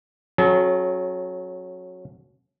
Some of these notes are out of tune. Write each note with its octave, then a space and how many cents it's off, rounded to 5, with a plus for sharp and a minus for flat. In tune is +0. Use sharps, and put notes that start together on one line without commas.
F#3 -10 C#4 -25 A4 -40